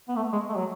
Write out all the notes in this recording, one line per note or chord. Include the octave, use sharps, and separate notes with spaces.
B3
A3
G#3
A3
F#3